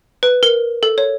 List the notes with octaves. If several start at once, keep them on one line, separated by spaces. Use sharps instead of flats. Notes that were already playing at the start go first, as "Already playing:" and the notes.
B4
A#4
A4
C#5